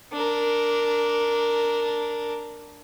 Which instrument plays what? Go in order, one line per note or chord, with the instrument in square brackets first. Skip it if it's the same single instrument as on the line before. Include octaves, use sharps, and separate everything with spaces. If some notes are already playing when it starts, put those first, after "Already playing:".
[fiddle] D4 A#4